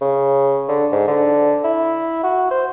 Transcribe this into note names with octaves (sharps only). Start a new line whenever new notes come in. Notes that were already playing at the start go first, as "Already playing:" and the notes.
C#3
D3
G#2
D3
E4
F#4
C5